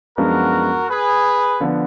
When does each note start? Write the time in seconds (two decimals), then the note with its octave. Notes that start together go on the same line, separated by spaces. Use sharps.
0.17 F#2 F3 G#3 B3 D4 F#4 A#4
0.89 G#4 B4
1.61 D3 F3 B3